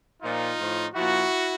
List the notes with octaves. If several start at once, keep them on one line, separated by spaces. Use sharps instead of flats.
A#2 F3 D#4 F4
A2 F3
A#2 F3 E4 F#4